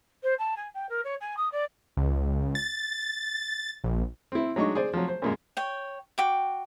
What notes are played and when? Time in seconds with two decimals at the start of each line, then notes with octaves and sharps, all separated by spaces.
0.23 C5
0.38 A5
0.56 G#5
0.74 G5
0.89 A#4
1.04 C#5
1.21 G#5
1.37 D#6
1.52 D5
1.97 C#2
2.55 A6
3.84 A#1
4.32 C4 E4
4.56 F#3 G#3 D4 D#4 C#6
4.75 G#4 C5 D5
4.94 F3 F#3
5.08 C5
5.22 F#2 A#2 G#3
5.57 C#5 G5
6.18 F#4 G5 D6